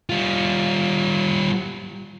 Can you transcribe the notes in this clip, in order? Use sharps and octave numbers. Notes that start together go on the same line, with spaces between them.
G3 F4